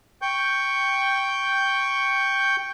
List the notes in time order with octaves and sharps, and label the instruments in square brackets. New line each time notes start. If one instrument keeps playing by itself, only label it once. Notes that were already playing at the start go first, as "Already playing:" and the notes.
[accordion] G5 C#6 G6